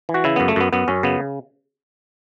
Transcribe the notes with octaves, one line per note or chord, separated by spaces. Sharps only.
E3
F#4
C#3 E4
F#2 B3
A3
F#2 B3
F#2 B3
F#2 C#4
C#3 B3